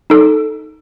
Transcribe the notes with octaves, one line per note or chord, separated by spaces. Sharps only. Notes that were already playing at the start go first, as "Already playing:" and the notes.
D#4 A4